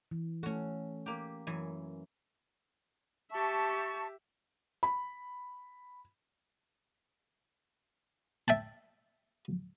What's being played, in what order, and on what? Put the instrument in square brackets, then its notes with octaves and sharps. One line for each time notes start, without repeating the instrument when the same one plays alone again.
[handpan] E3
[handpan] A3 A4 [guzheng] C#4 F#4
[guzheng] A#3 G4
F#2 E3 G#5
[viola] G4 E5 [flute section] A5 C#6
[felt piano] B5
[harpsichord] E5 G5 A5